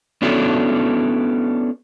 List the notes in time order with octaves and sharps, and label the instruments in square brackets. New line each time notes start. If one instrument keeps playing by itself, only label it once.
[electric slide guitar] B3 C#4 D4 E4 F#4 A4